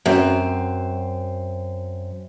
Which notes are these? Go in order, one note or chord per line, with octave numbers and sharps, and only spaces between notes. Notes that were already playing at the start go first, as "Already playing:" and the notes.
F#2 C4